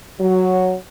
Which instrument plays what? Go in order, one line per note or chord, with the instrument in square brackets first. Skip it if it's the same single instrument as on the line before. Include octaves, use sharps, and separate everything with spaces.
[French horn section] F#3